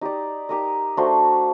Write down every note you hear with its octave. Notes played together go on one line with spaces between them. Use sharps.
D#4 G4 D5
D#4 G4 A#4 D#5
A3 D4 F#4 C5